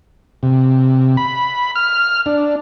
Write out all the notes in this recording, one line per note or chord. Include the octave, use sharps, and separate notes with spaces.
C3
B5
F6
D4